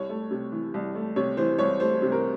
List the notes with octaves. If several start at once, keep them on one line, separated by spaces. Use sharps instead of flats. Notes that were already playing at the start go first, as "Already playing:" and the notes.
Already playing: C2 C#5
A3
C3
E3
C2
A3
C3 C#5
E3 C5
C2 C#5
A3 C5
C3
A#4